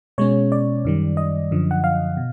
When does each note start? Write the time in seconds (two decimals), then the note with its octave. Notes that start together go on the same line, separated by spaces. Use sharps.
0.18 B2 G#3 C#4 C#5
0.52 D5
0.85 F#2 D#3 G3
1.17 D#5
1.51 F#2 D3 F3
1.71 F#5
1.84 F5
2.17 B2